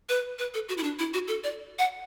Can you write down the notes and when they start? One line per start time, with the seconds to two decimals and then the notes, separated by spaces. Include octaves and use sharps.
0.09 B4
0.39 B4
0.54 A4
0.69 F#4
0.78 E4
0.83 D4
0.99 E4
1.14 F#4
1.28 A4
1.44 D5
1.79 F#5